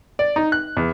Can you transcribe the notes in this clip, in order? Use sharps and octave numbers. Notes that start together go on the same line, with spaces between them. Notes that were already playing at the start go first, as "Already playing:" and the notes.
D5
D#4
F#6
E2